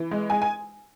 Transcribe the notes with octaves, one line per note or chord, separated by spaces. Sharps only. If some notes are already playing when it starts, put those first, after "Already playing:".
Already playing: E3
G#3
G#3 G#5
G#5